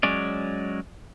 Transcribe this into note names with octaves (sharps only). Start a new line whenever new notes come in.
F#3 G#3 C#4 D5